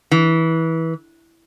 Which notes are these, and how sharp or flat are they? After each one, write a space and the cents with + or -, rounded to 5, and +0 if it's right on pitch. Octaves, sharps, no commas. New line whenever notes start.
E3 -20